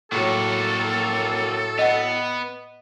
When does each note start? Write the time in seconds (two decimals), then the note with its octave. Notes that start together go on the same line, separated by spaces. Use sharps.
0.12 A2 F#3 A#3 F#4 A4
1.79 B3 D#5 F#5